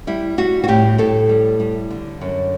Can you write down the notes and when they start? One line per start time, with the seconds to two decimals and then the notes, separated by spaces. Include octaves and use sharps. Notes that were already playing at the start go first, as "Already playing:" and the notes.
0.07 G3 E4
0.38 G3 F#4
0.64 F#4
0.68 A2 G4
0.98 A2 A4
1.29 G3
1.60 G3
1.91 D3
2.21 F#2